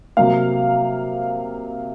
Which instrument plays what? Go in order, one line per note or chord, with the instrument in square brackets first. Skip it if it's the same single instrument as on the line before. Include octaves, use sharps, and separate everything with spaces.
[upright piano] C3 F#3 A#3 F5